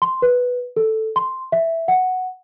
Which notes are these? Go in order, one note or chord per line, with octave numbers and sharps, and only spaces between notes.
C6
B4
A4
C6
E5
F#5